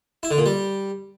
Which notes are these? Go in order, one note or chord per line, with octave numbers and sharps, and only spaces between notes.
E4
D3
A#2
G3